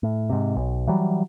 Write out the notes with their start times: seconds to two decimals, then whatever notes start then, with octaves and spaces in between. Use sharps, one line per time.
0.03 A2
0.30 G#2 C3
0.56 B1
0.87 E3 F#3 G3